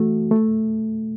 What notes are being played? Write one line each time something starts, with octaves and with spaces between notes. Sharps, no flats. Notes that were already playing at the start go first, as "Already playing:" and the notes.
Already playing: E3 A3 F#4
A3